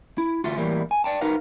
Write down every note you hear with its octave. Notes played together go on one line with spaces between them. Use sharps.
E4
D2 F4 F#4 E5 C6
A2 E3 F#3 G3 A#3 E4
G#5
D5 G5 A5
D#4 F#4 A#4 B4 F5